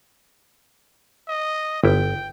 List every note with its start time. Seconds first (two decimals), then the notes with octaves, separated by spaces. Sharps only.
1.28 D#5
1.84 G1 E4 G5